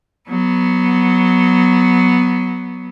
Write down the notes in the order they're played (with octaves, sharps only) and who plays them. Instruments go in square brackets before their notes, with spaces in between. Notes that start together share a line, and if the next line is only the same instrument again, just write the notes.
[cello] F#3 B3